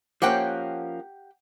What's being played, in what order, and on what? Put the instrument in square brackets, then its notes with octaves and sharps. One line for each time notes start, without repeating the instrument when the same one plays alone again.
[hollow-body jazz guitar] F3 A#3 C#4 [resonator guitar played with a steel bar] G4 F#5 G5